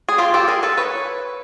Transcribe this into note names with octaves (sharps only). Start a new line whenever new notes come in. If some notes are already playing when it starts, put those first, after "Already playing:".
G#4
F4 G4
G4 A4
G#4 A#4
A4 B4
B4 C#5